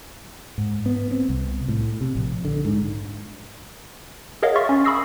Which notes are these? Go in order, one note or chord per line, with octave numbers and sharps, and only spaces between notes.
G#2
B3
C4
C2
A2
C3
A#1
D3
G#2
G#4 A#4 C#5 D#5 F5 F#5
E5 C6 C#6 F6 A6
C#4
B5 C#6 D#6 E6 A#6 C7